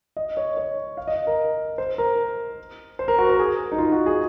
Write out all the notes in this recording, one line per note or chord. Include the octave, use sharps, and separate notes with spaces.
D#5
C#5
C#5
F5
D#5
A#4
C5
A#4
C5
A#4
F#4
A#4
G#4
D#4
F4
F#4
G#4